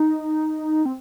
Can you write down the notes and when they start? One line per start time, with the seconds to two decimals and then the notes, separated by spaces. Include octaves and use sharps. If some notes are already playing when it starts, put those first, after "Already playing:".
Already playing: D#4
0.85 C4